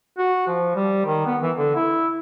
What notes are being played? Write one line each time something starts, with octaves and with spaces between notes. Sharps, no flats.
F#4
F3
G3
D#3
B3
E3
D3
E4